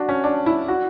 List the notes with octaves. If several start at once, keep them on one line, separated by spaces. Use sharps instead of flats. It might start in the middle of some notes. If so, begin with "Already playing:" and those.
Already playing: D4 F#4
C#4
D4
E4
F#4